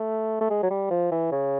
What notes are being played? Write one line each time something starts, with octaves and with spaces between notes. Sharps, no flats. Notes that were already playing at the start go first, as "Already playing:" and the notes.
Already playing: A3
A3
G#3
F#3
G3
F3
E3
C#3